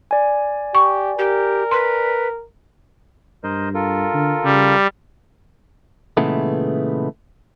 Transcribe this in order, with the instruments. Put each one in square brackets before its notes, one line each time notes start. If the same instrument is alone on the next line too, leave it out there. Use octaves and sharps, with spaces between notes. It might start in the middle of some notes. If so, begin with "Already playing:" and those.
[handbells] D5 G#5
[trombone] G4 [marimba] C#6
[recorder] G4 [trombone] A#4
[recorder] B4 [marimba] C6
[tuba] G2 [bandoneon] A#4 C5 D#5
[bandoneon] F4 A4 A#4
[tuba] D3
[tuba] C#3 [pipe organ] G3
[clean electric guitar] A#2 C#3 E3 G#3 A3 B3